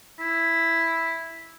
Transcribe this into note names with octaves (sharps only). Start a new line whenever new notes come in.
E4